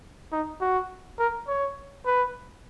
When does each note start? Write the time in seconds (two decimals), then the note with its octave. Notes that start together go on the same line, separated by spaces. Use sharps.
0.32 D#4
0.61 F#4
1.19 A#4
1.48 C#5
2.06 B4